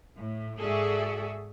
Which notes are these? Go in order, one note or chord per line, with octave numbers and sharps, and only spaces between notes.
A2
G#2 F#4 G#4 A4 D5 E5